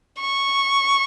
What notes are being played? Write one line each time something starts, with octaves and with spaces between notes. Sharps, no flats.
C#6